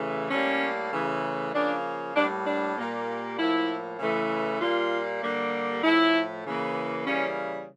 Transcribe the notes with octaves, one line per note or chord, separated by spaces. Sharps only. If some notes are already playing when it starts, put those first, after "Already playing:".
Already playing: C#3 E3 A3
A2 G3 A#3 C#4
C#3 E3 A3
C#3 F3 A#3 D4
A2 G3 A#3 D4
D4
A#2 G3 A#3
A2 F3 A#3 E4
C#3 E3 A3
A#2 G3 A#3 F4
D3 G3 A#3
A2 F3 A3 E4
C#3 E3 A#3
C#3 E3 G3 A#3 C#4